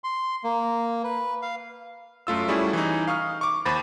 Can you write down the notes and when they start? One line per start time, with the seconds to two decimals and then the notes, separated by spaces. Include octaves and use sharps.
0.04 C6
0.44 A#3
1.04 B4
1.42 F5
2.27 F#2 A3 F4 E6
2.48 G3 A3 C#4 E4 F#4 G#4
2.73 E3 D#4
3.07 F5 C#6 D#6 F6
3.41 C#6 D6
3.65 D#2 C5 B5 A6